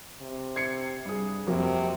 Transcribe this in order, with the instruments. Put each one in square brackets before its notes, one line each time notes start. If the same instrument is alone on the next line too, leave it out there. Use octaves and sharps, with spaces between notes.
[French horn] C3
[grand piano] G#6 C7 C#7
G2 G#4
[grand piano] F2 F#3 A#3 [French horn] C3